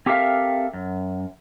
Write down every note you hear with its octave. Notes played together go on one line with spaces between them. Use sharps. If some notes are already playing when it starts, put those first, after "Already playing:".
C4 G4 A4 A#4 E5 F5
F#2